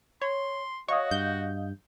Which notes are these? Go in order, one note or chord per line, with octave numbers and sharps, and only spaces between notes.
C#5 C6
F#4 C#5 D#5 F5 D#6
G2 G6